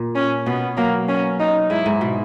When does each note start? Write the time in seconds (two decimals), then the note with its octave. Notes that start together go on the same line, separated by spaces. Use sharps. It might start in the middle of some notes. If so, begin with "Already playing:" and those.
Already playing: A#2
0.15 C#4
0.46 B2 B3
0.77 F#3 A#3
1.08 C#4
1.40 D#4
1.70 G#2 E4
1.86 G#2
2.01 B2